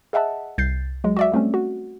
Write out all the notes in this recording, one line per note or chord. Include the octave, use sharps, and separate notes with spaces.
G#4 D#5 E5 F#5 A5
C2 G6 A6 C7
F#3 G#3
F#4 D5 E5
G3 A3 C4 C#4
F#4